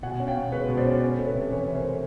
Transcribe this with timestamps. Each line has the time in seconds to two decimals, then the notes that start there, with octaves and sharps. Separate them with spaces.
0.03 B2 F#5 G#5
0.20 C#4
0.27 F5 G5
0.36 B2
0.52 G#3 B4 C#5
0.68 B2
0.77 C5 D5
0.85 C#4
1.02 C#4
1.18 A3
1.26 B4 C#5
1.35 C3
1.51 E3 B4 C#5
1.68 C#4
1.75 A#4 C5
1.84 A3